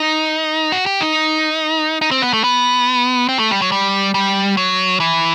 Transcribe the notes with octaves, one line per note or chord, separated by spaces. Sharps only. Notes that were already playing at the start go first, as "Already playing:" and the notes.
Already playing: D#4
F#4
G4
D#4
D#4
C4
B3
A3
B3
C4
A3
G3
F#3
G3
G3
F#3
E3